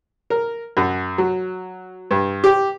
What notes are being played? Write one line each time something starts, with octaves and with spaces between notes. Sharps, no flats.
A#4
F#2
F#3
G2
G4